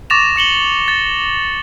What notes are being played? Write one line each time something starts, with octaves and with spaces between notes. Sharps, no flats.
C#6 D6 A6 A#6 E7 F7
D6 C#7 F#7 G7
A6